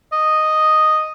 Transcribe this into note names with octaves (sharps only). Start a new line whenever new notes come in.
D#5